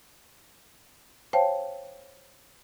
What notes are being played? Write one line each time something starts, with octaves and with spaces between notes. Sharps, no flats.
C5 C#5 F5 G5 A5